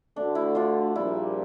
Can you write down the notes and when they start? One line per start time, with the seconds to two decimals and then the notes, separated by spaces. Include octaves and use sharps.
0.15 D2 D3 A3 D4
0.35 E4
0.55 D4 F4
0.96 A#1 A#2 G3 E4